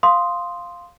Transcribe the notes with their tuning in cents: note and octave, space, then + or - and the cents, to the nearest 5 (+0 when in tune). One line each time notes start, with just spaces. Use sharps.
F5 +0 C6 +0 D#6 +0